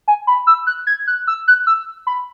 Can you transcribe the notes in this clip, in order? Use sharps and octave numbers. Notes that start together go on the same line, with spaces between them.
G#5
B5
E6
F#6
G#6
F#6
E6
F#6
E6
B5